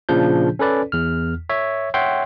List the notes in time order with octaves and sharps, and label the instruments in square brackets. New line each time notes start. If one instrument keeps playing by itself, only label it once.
[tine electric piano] A#2 C#3 F3 D4 G6
C#4 A4 B4 D5
E2 F6
C#5 E5
C#5 E5 F#5 G5 C6